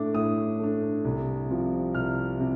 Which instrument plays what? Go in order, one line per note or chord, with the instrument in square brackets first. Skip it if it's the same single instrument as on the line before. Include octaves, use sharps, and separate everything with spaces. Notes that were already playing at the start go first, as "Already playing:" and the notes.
Already playing: [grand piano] A2 A3 D4 D6
A2 D#6
A3 D4
C2
C3 F3
C2 F6
C3